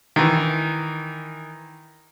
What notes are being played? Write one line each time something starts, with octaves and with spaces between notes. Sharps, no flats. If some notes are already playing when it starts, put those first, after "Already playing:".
D#3 E3